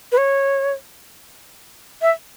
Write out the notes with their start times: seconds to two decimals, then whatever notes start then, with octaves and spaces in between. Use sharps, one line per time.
0.12 B4
0.17 C#5
2.02 E5